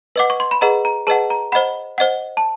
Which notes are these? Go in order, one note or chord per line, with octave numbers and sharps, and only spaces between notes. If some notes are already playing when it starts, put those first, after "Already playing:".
B4 D#5 F#5 D6
C#6
C6
B5
G#4 B4 D#5 F#5 A#5
A#5
G#4 B4 D#5 F#5 A5
A#5
C5 D#5 F#5 B5
C5 D#5 F#5
A5